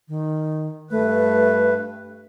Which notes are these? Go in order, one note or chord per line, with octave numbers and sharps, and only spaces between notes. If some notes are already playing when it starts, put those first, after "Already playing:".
D#3
G2 A3 B4